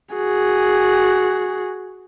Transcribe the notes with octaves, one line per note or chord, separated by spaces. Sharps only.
F#4 G#4